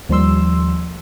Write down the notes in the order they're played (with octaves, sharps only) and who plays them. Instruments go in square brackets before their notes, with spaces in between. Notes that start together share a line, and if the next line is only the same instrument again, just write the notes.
[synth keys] D#2 F3 G3 C6 E6